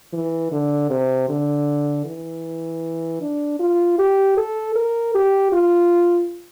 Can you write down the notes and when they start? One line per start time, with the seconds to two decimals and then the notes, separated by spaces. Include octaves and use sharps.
0.13 E3
0.52 D3
0.90 C3
1.29 D3
2.05 E3
3.22 D4
3.60 F4
3.99 G4
4.37 A4
4.75 A#4
5.15 G4
5.52 F4